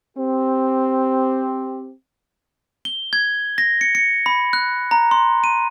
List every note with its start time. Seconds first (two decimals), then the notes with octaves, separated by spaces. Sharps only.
0.17 C4 G4
2.85 G7
3.13 G#6
3.58 A#6
3.81 C#7
3.95 C#7
4.26 B5
4.53 F#6
4.91 A#5
5.11 C6
5.44 D#7